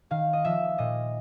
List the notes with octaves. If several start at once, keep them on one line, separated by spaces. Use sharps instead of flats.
D#3 F5
D#5
F3 E5
A#2 D#5